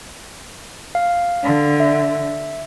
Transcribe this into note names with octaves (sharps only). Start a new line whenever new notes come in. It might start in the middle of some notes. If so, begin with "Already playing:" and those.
F5
D3
E5